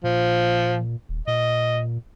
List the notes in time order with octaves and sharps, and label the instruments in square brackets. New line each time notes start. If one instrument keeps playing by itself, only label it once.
[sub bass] A#2 [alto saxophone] F3
[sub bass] D#1
[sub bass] A#2 [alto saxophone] D#5